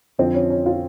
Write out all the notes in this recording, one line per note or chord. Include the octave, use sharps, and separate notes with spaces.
F2 D3 F3 C4
C#4
C#4
F4